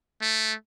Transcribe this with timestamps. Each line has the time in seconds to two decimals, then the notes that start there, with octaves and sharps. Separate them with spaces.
0.21 A3